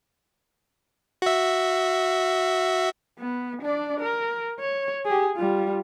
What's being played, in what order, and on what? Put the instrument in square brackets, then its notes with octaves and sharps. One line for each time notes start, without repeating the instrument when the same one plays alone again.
[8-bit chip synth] F#4 E5
[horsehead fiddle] B3
D4 D5
A#4
C#5
G4 G#4
G3 F4